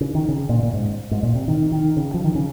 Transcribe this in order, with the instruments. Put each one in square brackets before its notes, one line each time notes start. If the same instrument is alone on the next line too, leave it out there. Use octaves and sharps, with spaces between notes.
[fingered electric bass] C#3
D#3
C#3
A#2
A#2
G#2
G#2
A#2
C3
D#3
D#3
C#3
F3
D#3
C#3